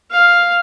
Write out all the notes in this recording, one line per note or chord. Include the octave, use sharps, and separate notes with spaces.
F5